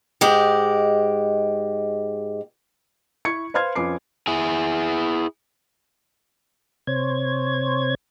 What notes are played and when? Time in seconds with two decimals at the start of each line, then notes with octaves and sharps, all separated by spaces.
0.21 G#2 G#3 G4
3.25 E4 C#6 G#6 C#7
3.54 B4 C5 F5 C6 F6 G#6
3.75 F2 C#4 F4 B4 D6 C7
4.27 E4 G#4
6.87 C3 C5 C#5 G#6